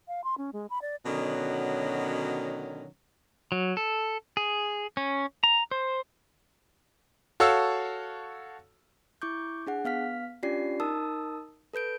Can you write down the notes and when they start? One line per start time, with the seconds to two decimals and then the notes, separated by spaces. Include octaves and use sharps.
0.08 F5
0.24 C6
0.38 C#4
0.53 G#3
0.70 B5
0.82 D5
1.06 B2 D3 D#3 F#3 C#4
3.52 F#3
3.77 A4
4.37 G#4
4.97 C#4
5.44 A#5
5.71 C5
7.40 F#4 A4 C#5 F5 A5 E6
9.22 E4 C#6 D6 G6
9.67 D4 G#4 F#5
9.85 B3 F5 F6 B6
10.43 C#4 D4 F4 G4 D5 C7
10.80 D#4 A#4 A5 D#6 E6
11.74 A4 B4 G6 D7